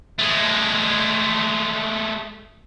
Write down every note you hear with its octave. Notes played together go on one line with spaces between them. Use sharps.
G#3 A3